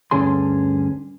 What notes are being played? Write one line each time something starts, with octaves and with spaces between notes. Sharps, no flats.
D2 G2 D3 C#4 G#4 C6